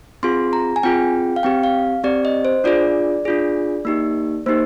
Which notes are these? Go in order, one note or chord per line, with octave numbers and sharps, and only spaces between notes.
C4 F4 G#4 C6
A#5
G#5
C4 F4 G#4 G5
F5
C4 G4 G5
F5
C4 G4 D5
D#5
C5
D4 F4 G#4 D5
D4 F4 G#4
A#3 D#4 G4
A#3 D#4 G4 C5